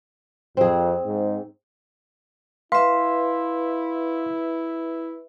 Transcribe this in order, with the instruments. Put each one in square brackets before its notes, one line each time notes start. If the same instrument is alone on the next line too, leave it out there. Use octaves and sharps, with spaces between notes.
[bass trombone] F2 [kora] C4 G#4
[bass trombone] G#2
[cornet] E4 [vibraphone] B4 E5 [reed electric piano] F5 C6